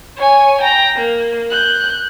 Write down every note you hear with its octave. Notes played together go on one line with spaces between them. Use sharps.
C#5 G#5
G5 A#5
A#3
F#6 G6